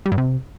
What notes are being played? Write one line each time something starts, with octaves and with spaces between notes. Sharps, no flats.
G3
G2
C3